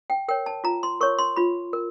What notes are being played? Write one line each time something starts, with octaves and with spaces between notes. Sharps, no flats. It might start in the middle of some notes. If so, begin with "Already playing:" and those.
G5
A#4 C#5 G5
A5
F4 A#5
C6
A#4 C#5 C#6
C6
F4 B5
A#4